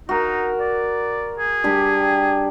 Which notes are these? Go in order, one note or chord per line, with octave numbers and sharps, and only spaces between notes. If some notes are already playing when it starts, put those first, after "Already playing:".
D#4 F#4 A#4
D5
G#4
G3 D4 G4